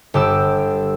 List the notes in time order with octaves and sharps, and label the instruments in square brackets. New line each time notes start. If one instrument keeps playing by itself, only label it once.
[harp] G1 G4 E6 D7